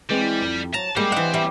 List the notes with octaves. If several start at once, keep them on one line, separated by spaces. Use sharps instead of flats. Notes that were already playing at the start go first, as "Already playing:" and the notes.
E3 G3 G#3 C4
F2
F#3 A5 A#5
G3 G#3 A#3 C4 C5
E3 D#5 F#5
G3 G4 E5